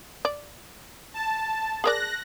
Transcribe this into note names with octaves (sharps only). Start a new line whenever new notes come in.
D5
A5
G#4 A#4 D5 F#6 A#6